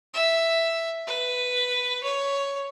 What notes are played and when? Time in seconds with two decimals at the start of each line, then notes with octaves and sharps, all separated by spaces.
0.14 E5
1.07 B4
2.03 C#5